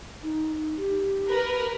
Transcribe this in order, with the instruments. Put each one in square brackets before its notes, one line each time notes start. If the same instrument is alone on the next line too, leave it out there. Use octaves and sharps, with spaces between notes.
[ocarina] D#4
G4
[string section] A#4 B4